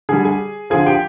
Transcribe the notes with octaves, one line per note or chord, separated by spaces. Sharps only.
D3 G3 G#4 G#5
G#4 G#5
D3 F3 G#4 G#5
G4 G5